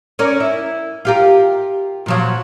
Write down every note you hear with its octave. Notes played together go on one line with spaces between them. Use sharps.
C#4 A#4 D5
E4
F4 G4 A#4
A#2 F3 F#3